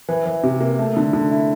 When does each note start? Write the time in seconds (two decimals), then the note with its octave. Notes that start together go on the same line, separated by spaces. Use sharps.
0.08 E3
0.26 E3
0.43 C3
0.61 A#3
0.79 A3
0.97 D3
1.13 D3
1.31 E4